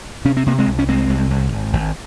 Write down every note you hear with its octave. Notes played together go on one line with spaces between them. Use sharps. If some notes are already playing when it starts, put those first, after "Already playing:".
C3 C#4
C4
C3 A#3
G#3 C4
C2
C#4
C2 G#3 C4
C2
C2
G#1
G#1